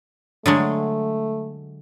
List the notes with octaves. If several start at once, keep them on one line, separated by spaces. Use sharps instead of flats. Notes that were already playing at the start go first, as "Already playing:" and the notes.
D3 F#3 G#3 A3